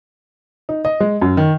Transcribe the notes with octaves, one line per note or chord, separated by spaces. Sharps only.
D#4
D#5
G#3
F#2
D#3